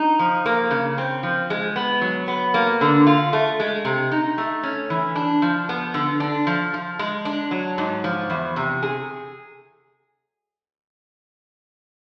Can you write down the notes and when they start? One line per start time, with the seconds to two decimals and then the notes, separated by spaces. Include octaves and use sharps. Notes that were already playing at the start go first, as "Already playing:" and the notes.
Already playing: D#4
0.19 F3
0.46 A#3
0.71 C#3
0.98 C4
1.23 F3
1.50 G#3
1.76 B3
2.01 F#3
2.28 B3
2.54 A#3
2.81 D3
3.07 F4
3.33 A3
3.60 G#3
3.85 C3
4.11 D#4
4.38 A3
4.63 C#4
4.90 E3
5.16 D4
5.42 F3
5.69 B3
5.94 D3
6.20 D4
6.47 F3
6.74 F3
6.99 G#3
7.25 D4
7.51 F#3
7.78 G#2
8.04 F3
8.30 E2
8.56 C3
8.83 G#4